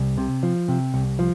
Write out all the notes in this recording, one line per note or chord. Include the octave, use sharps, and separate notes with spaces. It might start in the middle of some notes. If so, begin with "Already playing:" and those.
Already playing: C2
C3
F3
C3
C2
F3